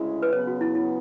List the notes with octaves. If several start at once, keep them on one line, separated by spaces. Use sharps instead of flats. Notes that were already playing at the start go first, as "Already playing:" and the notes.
Already playing: D2 C#3 G#3 C#4 E4
B4
C#3 F#3 B3 C#5
F#4
E4
E4